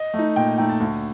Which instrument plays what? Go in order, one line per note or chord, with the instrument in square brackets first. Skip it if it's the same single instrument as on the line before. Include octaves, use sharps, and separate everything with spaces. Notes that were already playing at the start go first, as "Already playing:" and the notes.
Already playing: [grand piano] D#5
A3
D#4
A#2 G5
A3 D#4 G5
A5
D2